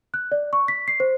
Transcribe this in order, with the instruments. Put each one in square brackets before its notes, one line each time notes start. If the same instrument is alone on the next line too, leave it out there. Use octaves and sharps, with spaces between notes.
[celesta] F#6
D5
C#6
B6
C7
C5